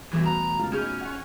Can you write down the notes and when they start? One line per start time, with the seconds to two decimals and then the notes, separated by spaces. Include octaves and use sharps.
0.13 E2 B2 E3 G3 A3
0.26 F#4 A#5
0.59 C#2 F4 A6
0.73 C#4 D#4 G#4 F6 G6 D7
1.01 F#5 C#6